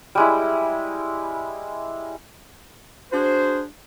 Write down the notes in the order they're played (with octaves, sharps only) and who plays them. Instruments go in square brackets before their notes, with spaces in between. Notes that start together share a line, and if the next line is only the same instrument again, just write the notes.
[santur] G3 G#3 E4
[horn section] D4 F#4 G#4 C5